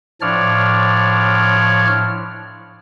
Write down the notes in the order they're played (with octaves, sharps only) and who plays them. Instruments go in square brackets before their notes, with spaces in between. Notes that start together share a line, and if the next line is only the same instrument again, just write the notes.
[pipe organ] A2 F3 D4 C#5 D5 F6